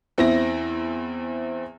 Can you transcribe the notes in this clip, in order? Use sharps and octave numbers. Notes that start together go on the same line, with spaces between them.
E2 C4 E4 E5 A#6